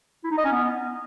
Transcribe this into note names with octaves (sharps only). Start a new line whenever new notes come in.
E4
D#4
D#5
C#4
B3